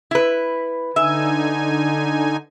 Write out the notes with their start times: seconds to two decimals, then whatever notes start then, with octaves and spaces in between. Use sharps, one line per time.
0.11 E4 B4
0.96 D3 D#4 E5 G#5